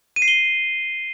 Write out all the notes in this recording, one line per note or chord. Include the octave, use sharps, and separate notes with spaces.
D#7
C7
G7